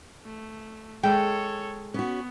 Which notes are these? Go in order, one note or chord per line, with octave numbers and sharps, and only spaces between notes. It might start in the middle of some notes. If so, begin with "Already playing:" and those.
A3
G#3 A4 C#5 G5
B3 C#4 F#4